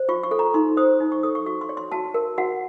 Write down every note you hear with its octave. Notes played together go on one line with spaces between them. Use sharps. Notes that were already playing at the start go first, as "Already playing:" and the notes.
Already playing: C5
F4 C#6
C#6
A4
A#5
D#4 C6
C5 D#6
D#4
C#6
A4 D#6
C#6
F#4 C#6
C6
C#5
C6
F#4 A5
A#4
F#4 F#5